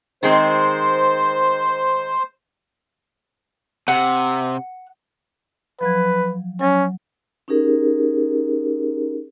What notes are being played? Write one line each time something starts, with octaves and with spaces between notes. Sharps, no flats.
D#3 G#3 C4 C5
C3 F#5
F3 F#3 B4 G#6
F#3 C#4
C#4 D#4 G4 G#4 A#4